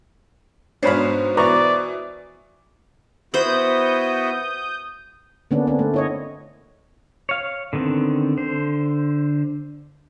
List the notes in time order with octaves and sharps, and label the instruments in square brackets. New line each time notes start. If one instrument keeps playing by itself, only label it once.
[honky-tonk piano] G#2 B2 B3 [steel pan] D4 C#5 B5 [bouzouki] C5 F5
[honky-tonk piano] B2 E3 [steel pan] B4 A#5 C#6 [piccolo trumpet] D5
[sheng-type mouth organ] B3 E4 F#4 [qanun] C5 B5 [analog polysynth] D#6 G6
[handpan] D3 A#3 B3 C#4 D4
B3 C4 D4
A3
E4 C#5 D#5
[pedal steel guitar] C#5 F5
D3 D#3 B3 C4
D3 C5